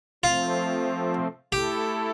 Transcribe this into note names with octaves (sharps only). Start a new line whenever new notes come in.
F3 A3 C4 F4
A3 E4 G4 A4